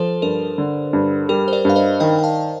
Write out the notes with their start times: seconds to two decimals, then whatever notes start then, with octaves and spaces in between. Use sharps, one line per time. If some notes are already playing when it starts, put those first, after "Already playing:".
Already playing: F3 A4 C5
0.22 G2 A#4
0.58 D3
0.93 G2
1.29 G3 A#4
1.48 C5
1.53 A#4 D5
1.65 G2 F5
1.76 C5 D#5
2.00 D#3 D#5 G5
2.18 G5
2.23 F5 A5